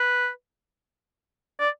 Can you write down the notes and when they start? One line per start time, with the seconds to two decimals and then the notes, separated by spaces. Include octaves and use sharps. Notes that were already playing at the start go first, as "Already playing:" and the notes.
Already playing: B4
1.60 D5